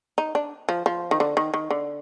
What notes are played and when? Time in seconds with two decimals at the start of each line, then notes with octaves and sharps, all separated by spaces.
0.18 D#4
0.35 D4
0.69 F3
0.86 F3
1.11 D#3
1.20 D3
1.37 D#3
1.54 D#3
1.70 D3